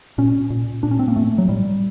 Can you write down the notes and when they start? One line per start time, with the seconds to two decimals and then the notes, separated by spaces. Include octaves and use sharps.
0.18 A#2 C#4
0.50 A#2
0.83 A#2 D4
0.91 C#4
0.99 C4
1.08 A#3
1.16 A2 A3
1.38 F#3
1.49 A2 G3